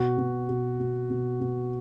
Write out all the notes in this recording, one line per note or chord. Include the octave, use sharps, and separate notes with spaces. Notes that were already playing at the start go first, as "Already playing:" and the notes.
Already playing: B2 F#4
B2
B2
B2
B2
B2